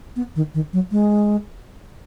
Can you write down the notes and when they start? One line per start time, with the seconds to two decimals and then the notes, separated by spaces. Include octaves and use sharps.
0.16 B3
0.36 D#3
0.54 D#3
0.73 F#3
0.92 G#3